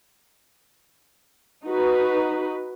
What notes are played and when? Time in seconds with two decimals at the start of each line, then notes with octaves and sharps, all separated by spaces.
1.66 D#4 F#4 B4